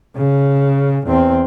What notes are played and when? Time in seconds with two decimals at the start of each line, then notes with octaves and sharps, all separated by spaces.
0.16 C#3
1.07 E2 C4